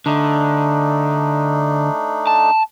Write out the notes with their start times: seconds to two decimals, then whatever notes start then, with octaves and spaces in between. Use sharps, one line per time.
0.06 D3 A3 D4 D#4
2.27 A5